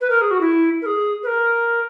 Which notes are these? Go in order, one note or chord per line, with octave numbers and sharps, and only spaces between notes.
B4
A#4
G#4
F#4
E4
A#4
G#4
B4
A#4